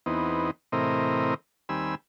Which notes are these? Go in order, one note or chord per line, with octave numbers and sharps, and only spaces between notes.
E2 B3 C4 D#4
A2 C3 E3 C4 A#4 D#5
D#2 G3 C4 G#5 B5 E6